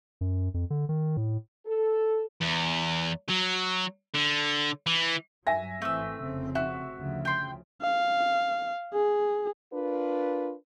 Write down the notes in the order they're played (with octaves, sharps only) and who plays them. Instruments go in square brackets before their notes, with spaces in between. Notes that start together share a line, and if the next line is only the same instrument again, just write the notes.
[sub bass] F#2
F2
D3
D#3
A2
[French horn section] A4
[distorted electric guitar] E2
F#3
D3
E3
[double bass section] G2 F#3 [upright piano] E5 G#5 A#6
[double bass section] G#1 E3 C4 [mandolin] A3 E6
[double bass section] F1 C#3 C4
[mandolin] F#4 [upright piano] E5
[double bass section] D2 C#3 F3
[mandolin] G5 C6
[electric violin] F5
G#4
[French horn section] D4 F4 A#4 B4